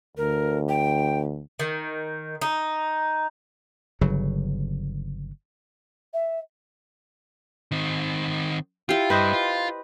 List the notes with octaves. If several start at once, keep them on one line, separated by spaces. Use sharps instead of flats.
D2 A#4
G5
D#3
D#4
G1 C#3 F#3
E5
D#3 C4
E4 F4 G4
G2 B4 C5 D#5
F4